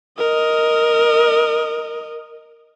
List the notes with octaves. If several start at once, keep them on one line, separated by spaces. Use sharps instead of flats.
A#4 D#5